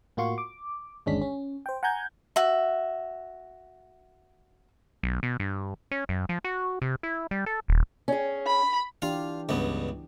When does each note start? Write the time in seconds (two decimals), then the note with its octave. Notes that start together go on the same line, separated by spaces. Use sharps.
0.17 A2 A#3 F4 F#4 C6 C#6
0.38 D6
1.06 G1 D#2 G#3 C#4 D4 B6
1.22 C#4
1.66 C5 G5
1.83 F#5 G#5 A#5 G6 G#6
2.36 F#4 E5
5.03 B1
5.23 B2
5.40 G2
5.91 C#4
6.09 F#2
6.29 F3
6.44 F#4
6.82 C3
7.03 E4
7.31 G3
7.46 A4
7.68 D#1
8.08 C#4 G#4
8.47 B5
9.02 E3 D4 F4 G4 F5
9.49 C#2 G2 B3